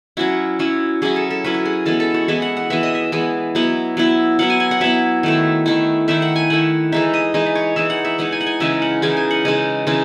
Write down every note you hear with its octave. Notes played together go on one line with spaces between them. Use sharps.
F#3 C#4 E4 F#4
F#3 C#4 E4
F#3 C#4 E4 G#4
A4
A4
F#3 C#4 E4 B4
F#4
G#4
E3 G#3 B3 A4
A4
F#4
E3 G#3 B3 E5
F#5
F#5
E3 G#3 B3 E5
D#5
E5
E3 G#3 B3
F#3 B3 E4
F#3 B3 E4
F#3 B3 E4 F#5
G#5
G#5
F#5
F#3 B3 E4 E5
D#3 A3 E4
D#3 A3 E4
D#3 A3 E4 E5
F#5
G#5
D#3 A3 E4 F#5
E3 G#3 D#4 E5
D#5
E3 G#3 D#4 D#5
B4
C#5
E3 G#3 D#4 E5
F#5
E5
E3 G#3 D#4 F#5
G#5
F#5
G#5
C#3 E3 G#3 D#4 E5
F#5
C#3 E3 G#3 D#4 G#5
G#5
F#5
C#3 E3 G#3 D#4 D#5
C#3 E3 G#3 D#4